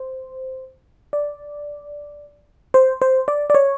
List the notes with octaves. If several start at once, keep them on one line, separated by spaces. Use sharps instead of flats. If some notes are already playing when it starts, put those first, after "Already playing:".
Already playing: C5
D5
C5
C5
D5
D5
C#5